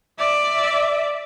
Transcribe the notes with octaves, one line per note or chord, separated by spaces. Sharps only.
D5 E5